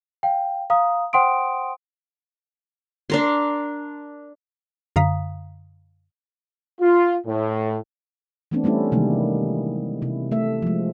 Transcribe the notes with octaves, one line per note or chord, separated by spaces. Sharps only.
F5 G5
F5 A#5 D#6
C5 F#5 G5 C6 D#6 D7
D4 A#4 C6
F#2 D3 F5 A#5 D#6 B6
F4
A2
E3 A3 B3 C4 D4
G3 A3 C#4 E4
C3 D#3 E3 G3 G#3 A#3
C3 E4
A3 E5
F3 G#3